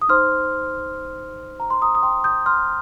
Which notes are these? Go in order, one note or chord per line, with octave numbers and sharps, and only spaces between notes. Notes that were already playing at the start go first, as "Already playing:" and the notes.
D#6
D#4 C5 C6 F6
A#5
C6
A#5 D#6
D#6
G5 C6
D#6 G6
C6 F6